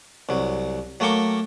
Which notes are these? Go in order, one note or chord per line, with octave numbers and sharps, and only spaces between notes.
C2 F#3
F#3 A3 A#3 G5 C#6 D6